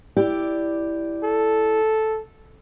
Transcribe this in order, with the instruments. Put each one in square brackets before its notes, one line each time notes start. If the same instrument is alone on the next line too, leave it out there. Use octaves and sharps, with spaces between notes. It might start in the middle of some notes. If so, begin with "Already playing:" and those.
[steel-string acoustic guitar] E4 G4 D5
[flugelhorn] A4